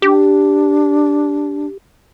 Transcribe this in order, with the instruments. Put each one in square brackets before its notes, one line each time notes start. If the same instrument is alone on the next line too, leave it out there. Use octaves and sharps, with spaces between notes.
[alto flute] D4 [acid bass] G4